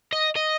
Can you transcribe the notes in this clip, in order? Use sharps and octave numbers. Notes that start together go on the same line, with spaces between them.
D#5
D#5